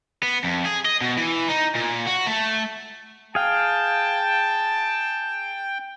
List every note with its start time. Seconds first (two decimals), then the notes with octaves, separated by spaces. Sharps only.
0.23 B3
0.44 F2
0.65 G#4
0.85 D#5
1.02 B2
1.17 E3
1.48 D#4
1.75 A#2
2.07 F#4
2.27 A3
3.35 G#4 F5 G5 A5